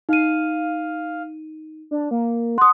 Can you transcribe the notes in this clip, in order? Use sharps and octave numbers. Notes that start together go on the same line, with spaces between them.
D#4 F5 D#7
D4
A#3
F#5 C6 D#6